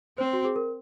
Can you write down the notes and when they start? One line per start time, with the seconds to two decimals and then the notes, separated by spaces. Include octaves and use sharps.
0.18 C4 C5
0.33 F#4
0.45 G#4
0.56 A#4